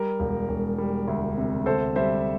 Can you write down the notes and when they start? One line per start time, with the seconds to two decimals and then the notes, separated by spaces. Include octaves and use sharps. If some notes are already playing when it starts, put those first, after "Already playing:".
Already playing: G3 A#4
0.20 E1
0.49 E1
0.78 G3
1.08 D2
1.37 C3
1.66 D2 A4 C5
1.96 G3 C5 E5